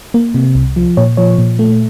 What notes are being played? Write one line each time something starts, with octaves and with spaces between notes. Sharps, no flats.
A#3
C3
C2
F3
A#2 C#5
F3 C#5
A#2
A3